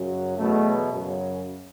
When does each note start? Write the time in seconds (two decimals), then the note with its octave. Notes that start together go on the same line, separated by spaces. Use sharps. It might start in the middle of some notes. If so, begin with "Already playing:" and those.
Already playing: F#2 C#3 F#3
0.37 E2 B2 F#3 A3
0.91 F#2 C#3 F#3